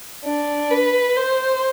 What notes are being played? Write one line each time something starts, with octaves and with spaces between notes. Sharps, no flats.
D4
B4
C5